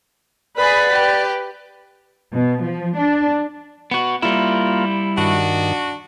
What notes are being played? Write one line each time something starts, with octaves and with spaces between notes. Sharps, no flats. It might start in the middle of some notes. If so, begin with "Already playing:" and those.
G#4 B4 D5 F#5 B5
G4
B2
F3
D4
B3 F#4
G3 A#3 E4 F4
G2 D#3 D4 F#4